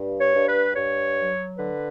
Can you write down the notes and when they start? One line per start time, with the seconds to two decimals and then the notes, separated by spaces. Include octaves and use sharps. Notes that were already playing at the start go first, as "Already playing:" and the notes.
Already playing: G2
0.21 C#5
0.34 G2
0.48 B4
0.75 G2 C#5
1.17 F#3
1.58 D3 B4